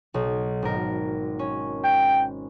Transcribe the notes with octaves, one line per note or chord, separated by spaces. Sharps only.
B1
G#1 A#4
C#4
G5